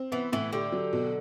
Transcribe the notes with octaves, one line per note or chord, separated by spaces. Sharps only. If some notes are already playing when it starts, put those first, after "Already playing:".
Already playing: C4
E3 B3
A2 E3
D3 G4
F#3
B2